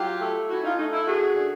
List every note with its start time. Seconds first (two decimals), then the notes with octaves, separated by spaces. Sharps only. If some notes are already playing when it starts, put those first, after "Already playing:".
Already playing: F#3 F4 G4
0.20 A3
0.50 C#4 E4 F#4
0.64 D#4 F4
0.78 A3 D#4
0.93 E4
1.07 C#4 F#4 G#4
1.36 D3